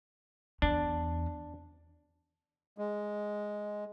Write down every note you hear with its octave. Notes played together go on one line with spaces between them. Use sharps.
E2 D4
G#3